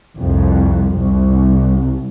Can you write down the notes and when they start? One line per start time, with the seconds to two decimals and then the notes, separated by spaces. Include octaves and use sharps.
0.17 C2 F2
0.96 C2